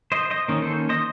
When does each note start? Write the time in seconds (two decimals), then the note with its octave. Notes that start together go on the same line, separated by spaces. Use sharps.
0.12 C5 D#5
0.30 C5 D#5
0.48 D#3 A#3 C#4
0.62 A4 C5
0.89 C5 D#5